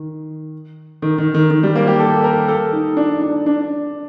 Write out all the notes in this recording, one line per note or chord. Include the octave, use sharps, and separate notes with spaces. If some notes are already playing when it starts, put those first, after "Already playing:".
Already playing: D#3
D#3
D#3
D#3
D#3
G3
A#3
G4
A4
A#4
A4
D#4
D4
D4
D4